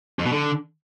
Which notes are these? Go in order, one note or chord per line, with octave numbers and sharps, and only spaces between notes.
F2
B2
D3